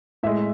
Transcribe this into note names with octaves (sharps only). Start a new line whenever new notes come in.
A2 G#3 E5